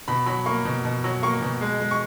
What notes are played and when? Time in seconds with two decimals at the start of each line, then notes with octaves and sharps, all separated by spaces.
0.08 B2 B5
0.26 F#3 B5
0.46 A#3 C#6
0.65 B2
0.85 B2
1.04 F#3
1.23 A#3 C#6
1.42 B2
1.61 G#3
1.81 G#3
1.91 C#6